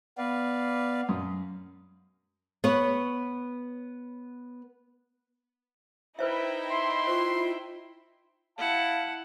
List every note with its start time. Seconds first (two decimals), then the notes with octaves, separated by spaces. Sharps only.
0.18 B3 B4 D5 F5
1.09 F#2 D#6
2.64 B3 B4 C#5
6.19 D#4 E4 B4 C5 E5 G5
6.71 C6
7.07 F4 C5 C#6
8.58 E4 F5 F#5 A5